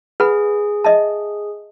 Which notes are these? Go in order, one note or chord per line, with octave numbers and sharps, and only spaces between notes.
G#4 B4 F#5 B5
D#5 E5 A5